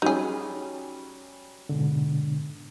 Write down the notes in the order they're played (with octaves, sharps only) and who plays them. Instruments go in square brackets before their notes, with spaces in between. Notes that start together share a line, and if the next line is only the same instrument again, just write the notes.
[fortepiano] F#3 G3 C#4 [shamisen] D#4 G#4
[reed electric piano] G#2 B2 D3